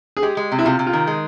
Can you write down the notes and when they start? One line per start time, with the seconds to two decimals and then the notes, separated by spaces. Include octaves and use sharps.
0.17 G#4
0.22 G#3 G4
0.37 G#3
0.52 C3
0.59 E4
0.65 C3 F4
0.79 C3
0.87 F4
0.93 D#3
1.07 G#3